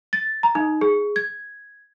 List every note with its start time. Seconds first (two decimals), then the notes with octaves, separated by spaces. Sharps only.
0.13 A6
0.43 A#5
0.55 D#4
0.81 G#4
1.16 G#6